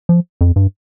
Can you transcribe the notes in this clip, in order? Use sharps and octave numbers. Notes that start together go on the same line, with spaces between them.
F3
F2
G2